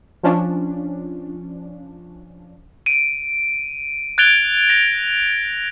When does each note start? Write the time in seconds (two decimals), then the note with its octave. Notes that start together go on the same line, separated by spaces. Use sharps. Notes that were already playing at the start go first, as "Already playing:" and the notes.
0.23 F3 C#4 D4
2.86 D7 D#7
4.18 F#6 G#6 A6 D7 F7 G7
4.69 A#6 F7